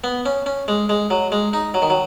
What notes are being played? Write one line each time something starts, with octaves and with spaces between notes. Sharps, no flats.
B3
C#4
C#4
G#3
G#3
F#3
G#3
D#4
F#3
D#3
F#3